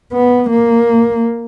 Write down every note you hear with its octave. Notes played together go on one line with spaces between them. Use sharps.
B3
A#3